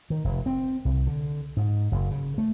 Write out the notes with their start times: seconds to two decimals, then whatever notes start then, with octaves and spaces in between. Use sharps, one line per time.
0.10 D#3
0.24 F1
0.46 C4
0.85 C2
1.07 D3
1.57 G#2
1.92 F#1
2.11 C#3
2.38 A3